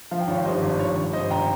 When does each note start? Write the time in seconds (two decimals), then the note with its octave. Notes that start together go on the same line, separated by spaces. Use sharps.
0.11 F3 F5
0.21 G5
0.27 G#1 C#5 F5
0.45 G2 C5 D#5
0.62 G#1
0.79 F3 C#5
0.96 G#1 C#5
1.13 G2 C5 D#5
1.30 G#1 G5 A#5